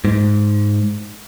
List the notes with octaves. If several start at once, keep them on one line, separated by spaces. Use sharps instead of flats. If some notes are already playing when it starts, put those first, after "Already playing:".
G#2